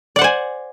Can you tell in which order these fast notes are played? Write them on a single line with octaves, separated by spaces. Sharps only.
D5 F#5 C5 G#5